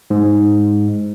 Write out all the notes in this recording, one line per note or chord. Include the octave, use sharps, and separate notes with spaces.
G#2